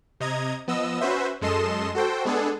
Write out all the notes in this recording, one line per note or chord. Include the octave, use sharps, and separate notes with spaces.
C3 D#5 A#5 G#6
F3 B3 D#5 E6
C#4 F#4 B4 C5 E5
F#2 G#3 A4 D#5 C6 E7
F#4 A4 C5 G5
G#3 B3 D4 G#4 A4